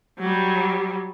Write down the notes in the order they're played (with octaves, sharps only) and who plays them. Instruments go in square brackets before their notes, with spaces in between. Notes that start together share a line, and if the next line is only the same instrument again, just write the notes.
[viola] F#3 G3